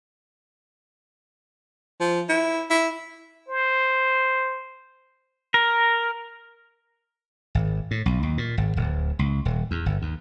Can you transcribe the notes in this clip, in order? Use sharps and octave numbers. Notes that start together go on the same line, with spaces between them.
F3
E4
E4
C5
A#4
G#1
A2
B1
D#2
A#2
G#1
D1
C#2
D#1
E2
G1
D#2